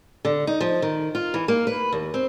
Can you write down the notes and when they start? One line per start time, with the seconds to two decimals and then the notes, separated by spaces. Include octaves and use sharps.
0.25 D3
0.47 D#4
0.60 F3
0.82 D#3
1.15 F4
1.34 E3
1.48 A#3
1.67 B4
1.93 D#2
2.14 C4